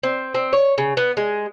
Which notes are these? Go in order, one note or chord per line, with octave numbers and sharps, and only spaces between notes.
C4
C4
C#5
C#3
B3
G#3